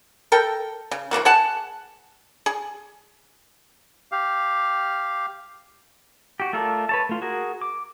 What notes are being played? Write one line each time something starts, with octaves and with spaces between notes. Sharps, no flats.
A4 A#4 G5
C#3
C#3 E3 A#3 F#4
G#4 F#5 A5
G#4
G4 F5
F#4 G4
A3 F4 A4 A#4 D5
B4 C#5 A5
A3 F4
F#4 G#4 A#4
D6